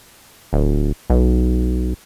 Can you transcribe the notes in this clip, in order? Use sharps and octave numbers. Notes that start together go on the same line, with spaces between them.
D1
B1